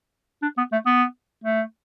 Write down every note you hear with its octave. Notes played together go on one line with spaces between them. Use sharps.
D4
B3
A3
B3
A3